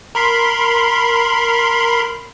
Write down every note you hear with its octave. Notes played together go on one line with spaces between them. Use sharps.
A#4 B5 C6